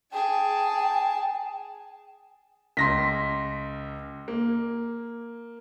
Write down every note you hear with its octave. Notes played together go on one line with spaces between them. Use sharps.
G#4 G5 A5
C#2 C6 A#6 B6
A#3